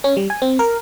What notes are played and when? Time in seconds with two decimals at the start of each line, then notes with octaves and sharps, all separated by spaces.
0.04 C#4
0.17 G3
0.30 G#5
0.42 C4
0.59 A#4